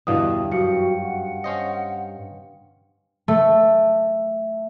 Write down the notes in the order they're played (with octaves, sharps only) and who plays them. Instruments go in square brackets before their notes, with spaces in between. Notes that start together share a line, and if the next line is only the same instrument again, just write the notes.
[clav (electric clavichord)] E2 B2 D3 [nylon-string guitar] G2 [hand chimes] E4 F5 D#6
[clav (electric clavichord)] F#2 [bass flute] F#4 [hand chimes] F5 G5 C#7
[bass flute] F#5
[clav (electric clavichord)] C#4 C5 D#5
[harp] A3